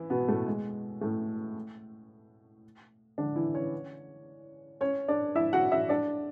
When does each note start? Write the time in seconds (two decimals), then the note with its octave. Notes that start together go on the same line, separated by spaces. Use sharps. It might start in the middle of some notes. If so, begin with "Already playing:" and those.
Already playing: E3 E4
0.10 B2 B3
0.28 A2 A3
0.47 G#3
1.01 A2 A3
3.18 D3 D4
3.36 E3 E4
3.54 C#4 C#5
4.81 C#4 C#5
5.08 D4 D5
5.35 E4 E5
5.53 F#4 F#5
5.71 E4 E5
5.89 D4 D5